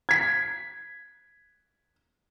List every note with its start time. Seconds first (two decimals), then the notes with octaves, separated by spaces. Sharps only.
0.09 G#6 B6